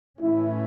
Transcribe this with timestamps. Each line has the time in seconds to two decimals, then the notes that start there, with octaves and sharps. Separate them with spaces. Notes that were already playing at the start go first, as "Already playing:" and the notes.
0.21 A2 E3 A3 C#4 E4